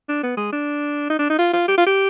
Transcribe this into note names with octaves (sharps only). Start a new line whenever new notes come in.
D4
B3
G#3
D4
D#4
D4
D#4
F4
F4
G4
F4
G4